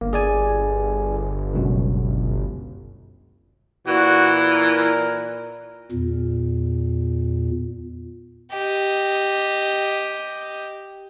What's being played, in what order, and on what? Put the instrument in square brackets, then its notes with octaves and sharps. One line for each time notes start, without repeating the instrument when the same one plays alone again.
[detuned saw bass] G1 [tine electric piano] A#3
[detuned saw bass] G1 [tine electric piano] G#4 D5 G#5
[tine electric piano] C#2 F#2 B2
[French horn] A#2 [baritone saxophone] E3 [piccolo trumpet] F#4
[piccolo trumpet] A#4
[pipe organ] E2 A#2
[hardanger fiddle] G4 D#5